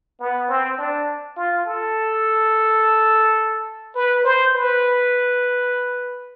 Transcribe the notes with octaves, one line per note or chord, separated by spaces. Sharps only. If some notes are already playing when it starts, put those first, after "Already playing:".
B3
C4
D4
F4
A4
B4
C5
B4